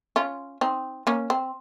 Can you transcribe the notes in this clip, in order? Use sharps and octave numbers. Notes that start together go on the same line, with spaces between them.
C#4 F4
C4 D#4
A#3 C#4
C4